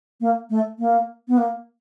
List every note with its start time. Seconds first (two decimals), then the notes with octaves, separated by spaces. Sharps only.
0.21 A#3
0.50 A3
0.79 A#3
1.28 B3
1.38 A#3